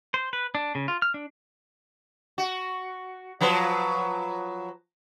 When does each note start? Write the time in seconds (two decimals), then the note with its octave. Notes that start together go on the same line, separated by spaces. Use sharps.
0.14 C5
0.33 B4
0.55 D4
0.75 C#3
0.88 F4
1.02 F6
1.14 D4
2.38 F#4
3.41 F3 F#3 B4